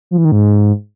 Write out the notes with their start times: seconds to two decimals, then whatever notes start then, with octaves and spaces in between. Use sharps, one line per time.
0.11 F3
0.18 E3
0.25 D#3
0.32 G#2